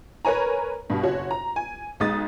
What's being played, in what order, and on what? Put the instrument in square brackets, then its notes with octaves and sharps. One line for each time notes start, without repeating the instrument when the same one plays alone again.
[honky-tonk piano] A#4 B4 C#5 G#5 A#5
G2 B2
F#1 F#4 C#5
A#5
G#5
B1 G#3 D#6 A6